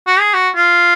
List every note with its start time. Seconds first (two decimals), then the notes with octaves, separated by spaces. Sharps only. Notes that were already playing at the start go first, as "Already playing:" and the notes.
0.07 F#4
0.20 G#4
0.34 F#4
0.56 F4